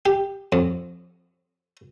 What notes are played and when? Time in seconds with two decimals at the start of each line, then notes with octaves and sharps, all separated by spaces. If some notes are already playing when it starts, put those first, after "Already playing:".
0.06 G4
0.52 F2